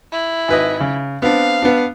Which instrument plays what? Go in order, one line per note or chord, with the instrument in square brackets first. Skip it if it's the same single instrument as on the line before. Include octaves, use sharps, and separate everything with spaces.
[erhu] E4
[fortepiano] G#1 B4 D#5
C#3
[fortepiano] B3 C4 D4 [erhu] F5
[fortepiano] B3 D4